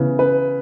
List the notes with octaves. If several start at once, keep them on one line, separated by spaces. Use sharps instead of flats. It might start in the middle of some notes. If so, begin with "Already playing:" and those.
Already playing: C#3 E3 B3
B4